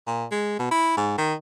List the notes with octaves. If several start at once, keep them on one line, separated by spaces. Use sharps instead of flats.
A#2
G#3
B2
E4
G#2
D#3